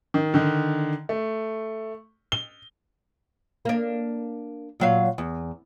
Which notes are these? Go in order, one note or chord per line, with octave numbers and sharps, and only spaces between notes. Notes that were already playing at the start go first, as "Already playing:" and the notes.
D#3
D3 D#3
A3
G7
A#3 D4
A#2 F#3 F5
E2